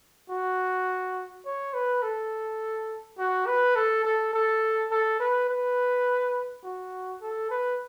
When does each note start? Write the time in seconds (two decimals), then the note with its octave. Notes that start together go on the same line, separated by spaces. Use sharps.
0.30 F#4
1.46 C#5
1.74 B4
2.03 A4
3.19 F#4
3.47 B4
3.76 A4
4.05 A4
4.33 A4
4.91 A4
5.20 B4
5.49 B4
6.64 F#4
7.22 A4
7.51 B4